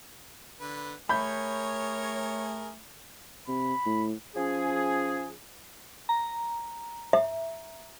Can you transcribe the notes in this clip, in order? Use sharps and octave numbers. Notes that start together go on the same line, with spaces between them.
D3 B4
A3 G#4 A#4 C#5 B5 G6
C3 B5
A2
F3 C#4 G#4
A#5
E5